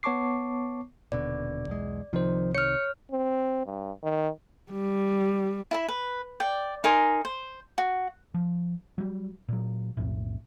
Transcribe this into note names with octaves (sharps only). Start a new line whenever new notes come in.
B3 C#5 A5 C#6 D6 C7
D#1 B2 D3 D5
B1 E2 G#3
C2 C3 D#3 F3 D#4 C5
C#5 F6 C#7
C4
G2
D#3
G3
E4 E5 B5
B4
D5 G5
D#4 A#4 G#5 C6
C5
F#4
F3
F#3 G3
A#2 F#3
B1 F2 A2